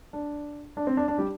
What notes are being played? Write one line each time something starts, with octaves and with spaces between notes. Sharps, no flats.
D4
D4
C4
D4
D4
G3 G4